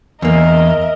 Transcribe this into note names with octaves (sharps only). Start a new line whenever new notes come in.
E2 A#3 A#4 D#5 E5